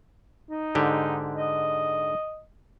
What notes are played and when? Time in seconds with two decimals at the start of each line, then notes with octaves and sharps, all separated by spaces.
0.50 D#4
0.75 G#2 D3 G4
1.38 D#5